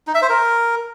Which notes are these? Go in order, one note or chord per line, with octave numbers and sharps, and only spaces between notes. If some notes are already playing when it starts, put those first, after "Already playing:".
D#4
E5
C5
A#4